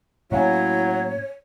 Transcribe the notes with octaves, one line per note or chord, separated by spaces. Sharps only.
A2 F#3 A#3 C#4 E4 C#5